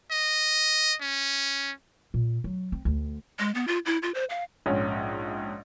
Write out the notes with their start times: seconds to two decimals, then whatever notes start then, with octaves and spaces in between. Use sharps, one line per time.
0.11 D#5
1.01 C#4
2.14 A#2
2.44 F#3
2.72 C4
2.85 D2
3.39 G#3
3.55 B3
3.68 F4
3.86 E4
4.03 F4
4.15 C5
4.30 F5
4.66 A#1 G#2 C#4